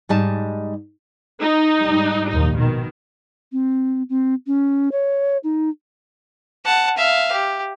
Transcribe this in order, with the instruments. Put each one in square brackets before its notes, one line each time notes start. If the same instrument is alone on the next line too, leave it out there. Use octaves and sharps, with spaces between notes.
[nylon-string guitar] G#2 G3 D#4 A5
[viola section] D#4
[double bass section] G#2 G3
[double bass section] A#1 D#2 [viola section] D#4
[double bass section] B2 [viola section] D#3
[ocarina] C4
C4
C#4
C#5
D#4
[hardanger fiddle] F#5 A5
E5 F5
G4